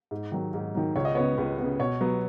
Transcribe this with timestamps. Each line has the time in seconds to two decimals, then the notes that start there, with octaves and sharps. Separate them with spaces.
0.11 G#2
0.32 D#3 F#3
0.54 G#2
0.75 D#3 F#3
0.96 C#2 C#5
1.05 D#5
1.15 C#3 B3 C#5
1.38 C#2 B4
1.59 C#3 B3
1.79 B2 C#5
2.01 F#3 B3